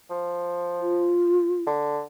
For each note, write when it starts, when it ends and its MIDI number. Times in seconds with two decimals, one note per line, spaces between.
0.10 1.12 53
0.80 1.62 65
1.67 2.03 50